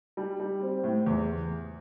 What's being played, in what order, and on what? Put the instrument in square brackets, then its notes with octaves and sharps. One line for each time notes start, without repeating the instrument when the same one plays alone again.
[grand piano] G3
G3
C4
A2
E2